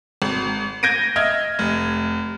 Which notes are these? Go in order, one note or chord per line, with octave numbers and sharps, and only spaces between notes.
G#1
G6 G#6 A#6 D7 D#7
D#5 E5 F6 G#6
F1